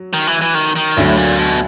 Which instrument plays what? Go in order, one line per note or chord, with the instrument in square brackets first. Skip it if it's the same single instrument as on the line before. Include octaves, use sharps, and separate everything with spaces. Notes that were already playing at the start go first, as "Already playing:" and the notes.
Already playing: [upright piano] F#3
[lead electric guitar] D#3
E3
E3
D#3
D#3
[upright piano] D2 D3 F#3 [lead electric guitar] A2
[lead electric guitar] A#2
B2